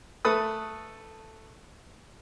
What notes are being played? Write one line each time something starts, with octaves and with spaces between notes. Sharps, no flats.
A3 A4 B4 D#6